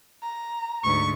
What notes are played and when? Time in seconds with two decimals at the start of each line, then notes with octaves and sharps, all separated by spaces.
0.23 A#5
0.84 D2 G#2 C#6